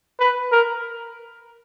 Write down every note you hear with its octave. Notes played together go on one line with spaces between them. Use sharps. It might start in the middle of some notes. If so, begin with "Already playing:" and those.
B4
A#4